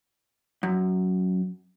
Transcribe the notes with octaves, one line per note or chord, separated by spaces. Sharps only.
F#2